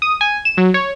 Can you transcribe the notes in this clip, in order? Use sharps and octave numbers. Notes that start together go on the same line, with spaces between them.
D#6
G#5
E7
F#3
C#5